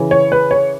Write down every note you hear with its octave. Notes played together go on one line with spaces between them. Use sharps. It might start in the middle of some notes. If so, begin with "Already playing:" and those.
Already playing: C#3 E3
C#5
B4
C#5